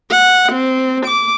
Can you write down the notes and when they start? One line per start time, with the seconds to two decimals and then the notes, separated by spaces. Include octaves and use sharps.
0.10 F#5
0.52 C4
1.06 D6